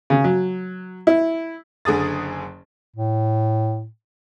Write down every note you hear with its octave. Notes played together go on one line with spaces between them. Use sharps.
C#3
F#3
E4
F#1 D3 G#4 D#6 A6
A2